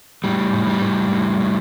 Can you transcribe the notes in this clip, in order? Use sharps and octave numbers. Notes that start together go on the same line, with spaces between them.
A2 G3
A2
G3
A2
A2
A2